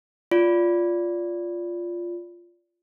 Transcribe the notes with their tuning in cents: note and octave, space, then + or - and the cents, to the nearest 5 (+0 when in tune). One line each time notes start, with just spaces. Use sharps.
F4 +0 D5 -20